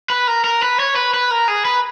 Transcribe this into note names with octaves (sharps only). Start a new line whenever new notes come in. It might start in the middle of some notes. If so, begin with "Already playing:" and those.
B4
A#4
A#4
B4
C#5
B4
B4
A#4
G#4
B4